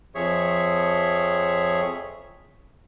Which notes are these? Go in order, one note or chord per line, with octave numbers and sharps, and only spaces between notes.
F2 F3 G#4 C#5 E5 C#6